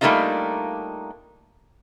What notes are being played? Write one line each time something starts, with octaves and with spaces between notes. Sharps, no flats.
G3 A3 A#3 D4 D#4 F4